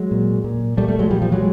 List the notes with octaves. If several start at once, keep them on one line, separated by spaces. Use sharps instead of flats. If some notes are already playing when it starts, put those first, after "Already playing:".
Already playing: F#3 G#3
A#2
A#2
A#2 G3 A3
G3 A3
F#3 G#3
A#2 F3 G3
F3 G3
F#3 G#3